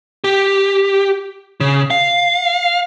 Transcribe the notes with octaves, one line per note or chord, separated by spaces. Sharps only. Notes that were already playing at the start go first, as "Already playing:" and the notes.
G4
C#3
F5